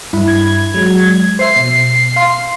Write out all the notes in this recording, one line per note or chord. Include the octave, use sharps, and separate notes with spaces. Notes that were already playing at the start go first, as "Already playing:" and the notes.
G2 E4 B5
G#6
F#3 G#3
C5 E5 C7
B2
F5 C6